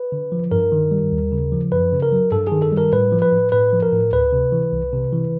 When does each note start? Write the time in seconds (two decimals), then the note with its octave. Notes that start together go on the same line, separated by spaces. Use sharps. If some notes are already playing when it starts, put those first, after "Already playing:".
Already playing: B4
0.12 D3
0.32 F3
0.51 G2 A#4
0.72 D#3
0.91 G3
1.12 D#2
1.32 C#3
1.52 F3
1.72 F#2 B4
1.92 C#3
2.02 A#4
2.12 F#3
2.32 G2 A4
2.47 D#3 G#4
2.62 A4
2.72 G3
2.78 A#4
2.93 A2 B4
3.12 F3
3.22 B4
3.32 A2
3.52 A2 B4
3.73 F3
3.83 A#4
3.93 A2
4.12 D2 B4
4.33 C3
4.52 E3
4.73 C2
4.93 C3
5.13 E3